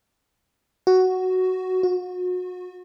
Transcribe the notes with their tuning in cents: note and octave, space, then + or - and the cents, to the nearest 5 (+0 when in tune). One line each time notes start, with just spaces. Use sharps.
F#4 +5
F#4 -35